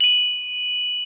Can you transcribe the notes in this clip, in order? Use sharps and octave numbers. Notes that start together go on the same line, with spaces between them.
D#7 F#7